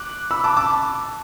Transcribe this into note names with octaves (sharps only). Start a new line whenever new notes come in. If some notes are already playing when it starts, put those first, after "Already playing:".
Already playing: D6 F#6
B5 E6
A5 D6
A5 D6